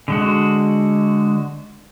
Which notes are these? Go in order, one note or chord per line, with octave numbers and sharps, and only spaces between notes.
D3 G#3 F#4